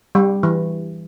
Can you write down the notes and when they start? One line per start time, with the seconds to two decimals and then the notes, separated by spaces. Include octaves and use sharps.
0.15 G3
0.43 E3